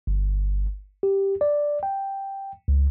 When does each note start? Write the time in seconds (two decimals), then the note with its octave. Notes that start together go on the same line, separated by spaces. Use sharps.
0.07 G1
1.03 G4
1.41 D5
1.83 G5
2.68 C#2